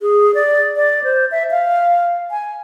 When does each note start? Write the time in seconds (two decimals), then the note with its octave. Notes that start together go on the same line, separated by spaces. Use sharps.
0.02 G#4
0.35 D5
0.76 D5
1.04 C5
1.31 E5
1.51 F5
2.31 G#5